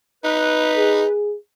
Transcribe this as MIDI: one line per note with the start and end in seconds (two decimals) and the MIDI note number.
0.24 1.05 63
0.24 1.12 71
0.76 1.35 68